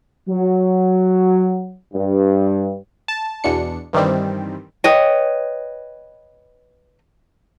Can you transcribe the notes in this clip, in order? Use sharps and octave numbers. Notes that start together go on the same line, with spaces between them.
F#3
G2
A5
E2 B2 D4 C#7
G2 D#3 E3 G3 C4
B4 C#5 D#5 G5